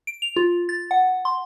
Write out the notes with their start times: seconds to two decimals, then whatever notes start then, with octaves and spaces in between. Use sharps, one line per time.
0.07 D7
0.22 F7
0.36 F4
0.69 A6
0.91 F#5
1.25 C6